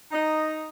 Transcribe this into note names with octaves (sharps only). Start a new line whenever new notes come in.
D#4